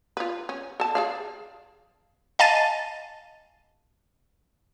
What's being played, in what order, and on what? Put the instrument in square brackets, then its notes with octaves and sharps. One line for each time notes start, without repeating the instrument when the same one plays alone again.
[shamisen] F4 B4
C#4
A4 A5
G#4 D5 F5
[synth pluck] D#5 F5 G#5 A5 A6 D#7